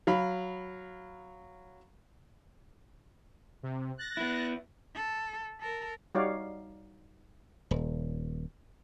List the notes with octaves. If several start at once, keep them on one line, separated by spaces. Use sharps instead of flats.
F#3 F5 B5
C3
F#6 A6 A#6
B3 E4
A4
A4 A#4
G3 D#4 F#4 C#5 D5 F5
D#1